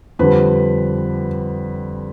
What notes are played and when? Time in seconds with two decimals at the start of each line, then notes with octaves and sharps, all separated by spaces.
0.19 F2 D3 G3 B4